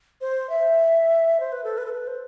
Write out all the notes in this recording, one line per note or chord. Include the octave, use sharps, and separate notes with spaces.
C5
E5
C5
B4
A4
B4
A4
B4
C5